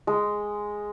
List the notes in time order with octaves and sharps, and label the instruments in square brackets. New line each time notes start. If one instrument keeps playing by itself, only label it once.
[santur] G#3